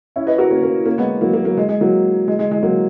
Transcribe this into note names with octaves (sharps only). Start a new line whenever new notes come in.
C#4 E4
B4 D#5
F#4 A#4
A#3 C#4
A#3 C#4
A#3 C#4
G#3 B3
F#3 A#3
F#3 A#3
F#3 A#3
G#3
G#3
F#3 A#3
G#3
G#3
G#3
F#3 A#3